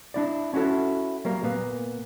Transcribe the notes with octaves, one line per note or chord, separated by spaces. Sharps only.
D4 E4 D5
C#4 E4 F#4 A4 C#5
F#3 G3 A#3 A#4
A#2 A#3 B3